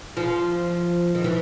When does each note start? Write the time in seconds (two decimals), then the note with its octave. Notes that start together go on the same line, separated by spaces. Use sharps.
0.17 F3
1.15 D#3
1.24 E3